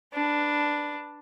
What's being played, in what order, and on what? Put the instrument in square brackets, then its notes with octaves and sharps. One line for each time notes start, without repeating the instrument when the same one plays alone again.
[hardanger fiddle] D4 B4